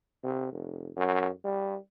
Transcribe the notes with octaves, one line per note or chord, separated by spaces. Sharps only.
C3
F1
F#2
G3